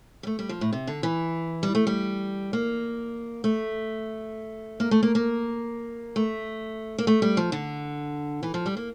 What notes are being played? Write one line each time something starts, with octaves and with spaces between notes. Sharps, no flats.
G3
A3
G3
F3
A2
C3
D3
E3
G3
A3
G3
A#3
A3
A#3
A3
A#3
A#3
A3
A#3
A3
G3
F3
D3
E3
F3
G3
A#3